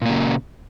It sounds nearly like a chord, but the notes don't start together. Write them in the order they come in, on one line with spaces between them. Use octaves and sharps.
A#2 A#3 C#3